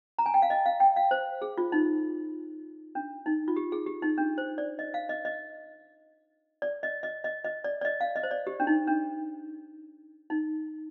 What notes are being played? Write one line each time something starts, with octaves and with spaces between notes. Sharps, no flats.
A#5
G#5
G5
F5
D#5
F5
G5
F5
C5
G#4
F4
D#4
D4
D#4
F4
G4
G#4
G4
D#4
D4
C5
D5
D#5
F5
D#5
D#5
D5
D#5
D#5
D#5
D#5
D5
D5
D#5
F5
D#5
C5
D5
G4
D4
D#4
D4
D#4